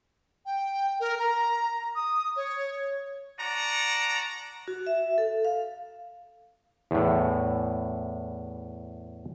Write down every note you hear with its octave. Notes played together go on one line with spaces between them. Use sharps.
G5
A#4
A#5
D#6
C#5
F#4 D5 F#5 A5 A#5
F#4
E5
A4
F5
E2 A2